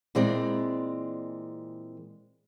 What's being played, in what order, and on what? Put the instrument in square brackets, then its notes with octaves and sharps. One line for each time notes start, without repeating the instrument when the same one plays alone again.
[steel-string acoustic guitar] A#2 E3 G#3 C4 D5